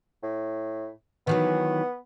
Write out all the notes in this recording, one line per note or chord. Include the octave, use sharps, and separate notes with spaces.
A2
D#3 E3 F#3 B3